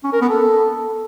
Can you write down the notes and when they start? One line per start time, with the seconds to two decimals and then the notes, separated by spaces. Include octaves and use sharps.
0.04 C#4
0.12 A#4
0.21 B3
0.30 A4